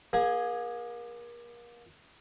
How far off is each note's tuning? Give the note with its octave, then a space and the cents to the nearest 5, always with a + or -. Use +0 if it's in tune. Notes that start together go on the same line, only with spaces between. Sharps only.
A#3 +35 G#4 +0